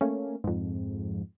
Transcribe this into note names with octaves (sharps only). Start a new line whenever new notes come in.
A3 A#3 C#4
F2 G#2